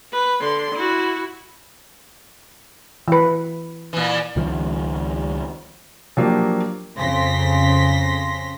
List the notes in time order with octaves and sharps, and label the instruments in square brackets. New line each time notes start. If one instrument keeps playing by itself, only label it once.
[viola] B4
D3 C6
E4 F#4
[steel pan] E3 B4
[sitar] A#2 E3
[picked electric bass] C#2 D#3 F3
[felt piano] F3 F#3 A#3 D4 G4
[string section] F2 C#3 C6 A#6 B6